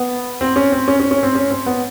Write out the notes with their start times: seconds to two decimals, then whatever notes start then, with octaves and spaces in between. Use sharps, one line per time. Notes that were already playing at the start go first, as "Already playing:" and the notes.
Already playing: B3
0.41 C4
0.56 C#4
0.72 C4
0.88 C#4
1.00 C#4
1.11 C#4
1.23 C4
1.35 C#4
1.51 C4
1.66 B3